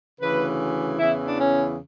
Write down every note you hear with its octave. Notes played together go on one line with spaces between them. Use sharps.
D2 C#3 E3 B4
E2 C#3 E3 E4
D4
C#4